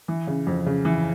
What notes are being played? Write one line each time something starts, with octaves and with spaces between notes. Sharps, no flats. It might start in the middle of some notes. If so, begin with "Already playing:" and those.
E3
C#3
F2
C#3
E3